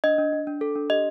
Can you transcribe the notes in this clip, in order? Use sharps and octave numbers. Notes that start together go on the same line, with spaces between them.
D4 D#5
D4
D4
D4
A4
D4
G4 D#5